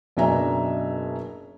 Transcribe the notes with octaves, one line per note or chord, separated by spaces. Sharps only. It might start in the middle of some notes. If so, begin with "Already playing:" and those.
F#1 B2 D4 E5 G#5 A#5